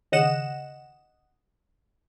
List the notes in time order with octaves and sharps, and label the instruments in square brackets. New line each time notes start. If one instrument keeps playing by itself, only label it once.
[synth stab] D#2 C#3 D#5 F#5 E7